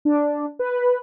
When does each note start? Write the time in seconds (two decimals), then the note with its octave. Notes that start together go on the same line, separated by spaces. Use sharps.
0.05 D4
0.59 B4